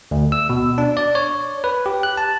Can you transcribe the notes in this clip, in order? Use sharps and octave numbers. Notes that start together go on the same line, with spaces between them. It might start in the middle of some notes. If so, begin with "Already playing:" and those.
D2
E6
B2
D4
D5
C#5
B4
G4
F#6
A5